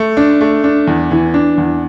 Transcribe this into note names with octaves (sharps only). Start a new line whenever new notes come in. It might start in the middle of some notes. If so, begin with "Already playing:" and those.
Already playing: A3
D4
A3
D4
E2
E3
D4
E2